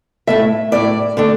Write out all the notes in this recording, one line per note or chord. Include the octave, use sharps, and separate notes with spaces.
A2 A3 E4 E5
A2 A3 E4 D5
D3 A3 D4